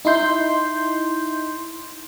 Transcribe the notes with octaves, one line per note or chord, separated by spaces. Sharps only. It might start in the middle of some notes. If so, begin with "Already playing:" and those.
D#4 E4 C6 G6